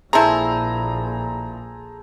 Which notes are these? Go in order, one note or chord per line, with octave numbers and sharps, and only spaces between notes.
A#1 A#2 C4 E4 G#4 A4 C5 A#5